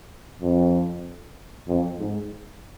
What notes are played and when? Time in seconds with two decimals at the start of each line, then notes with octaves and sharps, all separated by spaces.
0.42 F2
1.67 F2
1.99 G#2